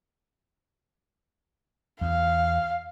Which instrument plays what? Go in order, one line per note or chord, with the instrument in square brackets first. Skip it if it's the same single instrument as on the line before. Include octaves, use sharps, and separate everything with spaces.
[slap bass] E2 [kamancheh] F5